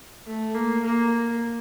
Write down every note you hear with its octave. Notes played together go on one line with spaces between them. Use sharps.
A3
A#3
A#3